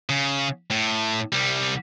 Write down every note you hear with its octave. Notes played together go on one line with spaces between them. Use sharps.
C#3
A2
C2 G3